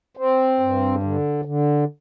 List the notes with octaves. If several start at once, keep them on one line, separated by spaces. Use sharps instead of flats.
C4
G2
D3
D3